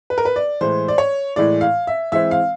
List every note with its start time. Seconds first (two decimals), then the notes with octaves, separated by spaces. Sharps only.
0.10 B4
0.18 A#4
0.25 B4
0.36 D5
0.61 A2 E3 G#3 C5
0.88 D5
0.98 C#5
1.36 A2 E3 G#3 D5
1.61 F5
1.87 E5
2.12 E3 G#3 C4 E5
2.31 F5